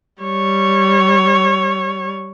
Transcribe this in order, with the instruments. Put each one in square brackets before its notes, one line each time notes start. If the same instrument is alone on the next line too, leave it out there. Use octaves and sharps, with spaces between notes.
[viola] G3 C#5